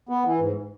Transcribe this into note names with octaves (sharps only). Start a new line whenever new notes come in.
B3
E3
G#2